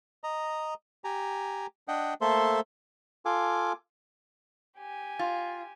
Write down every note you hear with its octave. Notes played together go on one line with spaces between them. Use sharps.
D#5 A#5
G4 G#5 A#5
D4 D#5 F#5 G5
A3 A#3 A4 C5 E5 C6
F4 A4 F5 G#5 D6
G4 G#5
F4